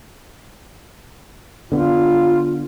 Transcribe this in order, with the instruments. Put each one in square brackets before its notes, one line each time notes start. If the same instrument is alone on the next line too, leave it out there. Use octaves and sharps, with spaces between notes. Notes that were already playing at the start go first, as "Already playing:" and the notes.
[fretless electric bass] D3 B3 [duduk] F4